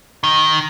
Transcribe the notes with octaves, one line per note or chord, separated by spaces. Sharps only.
D#3